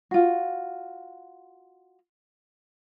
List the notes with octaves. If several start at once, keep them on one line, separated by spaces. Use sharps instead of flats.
F4 F#4